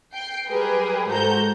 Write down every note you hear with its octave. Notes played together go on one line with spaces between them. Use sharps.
G5 C7
F#3 G3 G4 G#4 A#4 B4
G#2 F#4 A4 C5 A#5 G6